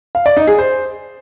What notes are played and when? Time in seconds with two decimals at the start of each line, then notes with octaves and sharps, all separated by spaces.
0.15 F5
0.26 D5
0.37 D#4
0.47 G#4
0.58 C5